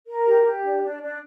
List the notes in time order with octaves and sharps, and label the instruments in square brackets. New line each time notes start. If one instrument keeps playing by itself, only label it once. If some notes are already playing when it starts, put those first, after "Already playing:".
[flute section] A#4
G4
G4
D4
D4
D4